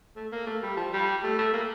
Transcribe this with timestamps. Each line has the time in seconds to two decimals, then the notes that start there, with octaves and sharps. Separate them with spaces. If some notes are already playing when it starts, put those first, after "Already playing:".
0.16 A3
0.32 A#3
0.46 A3
0.62 G3
0.77 F3
0.93 G3
1.23 A3
1.39 A3
1.53 A#3